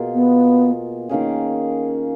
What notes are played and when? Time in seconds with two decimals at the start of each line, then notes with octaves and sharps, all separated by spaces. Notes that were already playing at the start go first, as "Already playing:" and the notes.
Already playing: B2 A#3 F4 G#4
0.15 B3
1.09 D#3 A#3 C#4 G#4